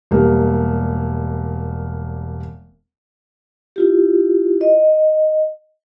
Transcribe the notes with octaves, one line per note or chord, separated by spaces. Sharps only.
E1 G3 A#3
E4 F4 G4
D#5